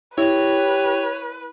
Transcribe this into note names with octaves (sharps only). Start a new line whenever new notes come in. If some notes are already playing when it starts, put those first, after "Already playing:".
E4 G4 B4 C#5